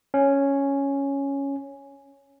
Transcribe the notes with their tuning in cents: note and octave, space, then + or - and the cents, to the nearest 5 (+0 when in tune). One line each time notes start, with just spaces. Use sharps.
C#4 +0